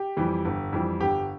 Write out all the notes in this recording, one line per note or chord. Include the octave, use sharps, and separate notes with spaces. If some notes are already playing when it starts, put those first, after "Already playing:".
Already playing: G4
F2 E3 G3
G1
F2 E3 G3
G1 G4